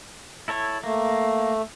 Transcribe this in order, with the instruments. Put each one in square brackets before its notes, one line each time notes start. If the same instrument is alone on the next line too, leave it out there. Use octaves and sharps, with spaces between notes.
[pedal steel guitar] E4 A4 C#5
[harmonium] A3 [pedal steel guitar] A#3